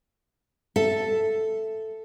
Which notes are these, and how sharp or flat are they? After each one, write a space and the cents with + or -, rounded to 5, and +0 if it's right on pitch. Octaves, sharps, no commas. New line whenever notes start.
A4 +0 E5 +10